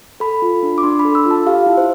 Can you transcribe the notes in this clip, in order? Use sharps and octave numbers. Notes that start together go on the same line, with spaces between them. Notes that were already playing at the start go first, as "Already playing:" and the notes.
A4 B5
F4
D4
D6
D4 C6
B5
A4
E6
F4
A5
G4 F5
E4
C5